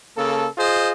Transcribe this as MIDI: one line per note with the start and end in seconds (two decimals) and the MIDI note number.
0.16 0.47 49
0.16 0.47 58
0.16 0.47 69
0.58 0.92 65
0.58 0.92 68
0.58 0.92 72
0.58 0.92 75